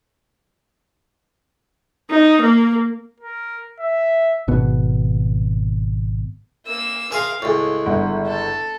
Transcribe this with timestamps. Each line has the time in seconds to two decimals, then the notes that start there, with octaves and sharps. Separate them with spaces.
2.10 D#4
2.42 A#3
3.20 A#4
3.80 E5
4.48 G#1 B2 B3
6.66 A#3 E6
7.12 G#4 A#4 F5 G#5 C6
7.42 C#2 A2 G#3
7.86 G1 F#5
8.26 A4